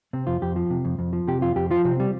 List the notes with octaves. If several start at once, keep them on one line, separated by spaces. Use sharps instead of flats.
C3 C4
F2 F4
F2 G4
F3
C3
F2
F2
F3
C3 G4
F2 F4
F2 G4
F3 F4
C3 C4
G3